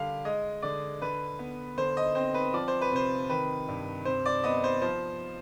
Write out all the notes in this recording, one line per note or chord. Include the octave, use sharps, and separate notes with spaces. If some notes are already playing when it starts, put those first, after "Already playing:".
Already playing: D3 G3 F5
G#3 D#5
D3 D5
D3 B4
B3
D3 C5
D#5
C4 C5
B4
F3 D5
C5
B4
C3 C5
D#3 B4
G2
C3 C5
D5
B3 D#5
C5
F3 C5